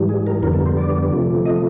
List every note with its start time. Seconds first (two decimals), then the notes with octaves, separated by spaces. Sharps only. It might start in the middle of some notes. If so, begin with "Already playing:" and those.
Already playing: G#2 E3 G3
0.09 G#4
0.27 A#4
0.42 F2 D3 G3 B3 A#4
0.54 A4
0.66 C5
0.77 D5
1.11 C3 F3 A3
1.46 D#5